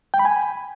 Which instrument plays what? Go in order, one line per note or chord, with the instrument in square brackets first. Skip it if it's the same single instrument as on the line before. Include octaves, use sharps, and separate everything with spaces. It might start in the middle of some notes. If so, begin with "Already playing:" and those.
[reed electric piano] G5
B5
G#5